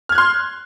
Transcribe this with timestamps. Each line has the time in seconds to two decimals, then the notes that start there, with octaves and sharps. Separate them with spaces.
0.09 F6
0.12 G#6
0.15 F#6
0.18 C6